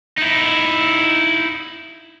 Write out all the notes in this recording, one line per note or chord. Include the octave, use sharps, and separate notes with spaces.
D#4 E4